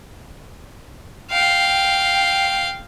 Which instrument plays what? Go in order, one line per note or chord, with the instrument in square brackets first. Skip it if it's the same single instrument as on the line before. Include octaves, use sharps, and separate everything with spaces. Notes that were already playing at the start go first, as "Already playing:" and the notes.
[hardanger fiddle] F5 G5